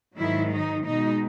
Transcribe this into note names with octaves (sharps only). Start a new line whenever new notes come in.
G#2 D#3 F#3 E4
D#4
B2 G#3 D#4